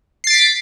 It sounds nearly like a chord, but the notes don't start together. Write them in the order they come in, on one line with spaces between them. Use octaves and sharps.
C7 A6 D7 B6